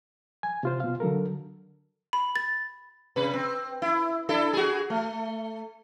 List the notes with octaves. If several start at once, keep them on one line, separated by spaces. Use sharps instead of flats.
G#5
C3 F4 C5
B2 F5
D3 F#3 A4 A#4
B5
A6
C3 B4
C4
E4
D4 E4 A4
F#4 G#4
A3